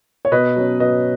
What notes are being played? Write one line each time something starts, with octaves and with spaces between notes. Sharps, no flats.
C#5
B2 B4 D#5
F#3 C#4
B2 B4 D#5